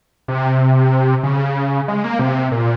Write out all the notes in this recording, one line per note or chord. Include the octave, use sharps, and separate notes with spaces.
C3
C#3
G#3
A#3
C3
A#2